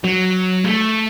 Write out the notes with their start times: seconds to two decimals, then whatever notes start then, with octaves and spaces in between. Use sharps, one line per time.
0.04 F#3
0.64 A3